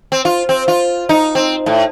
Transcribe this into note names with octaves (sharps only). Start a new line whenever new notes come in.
C4
F4
C4
F4
D#4
C4
A2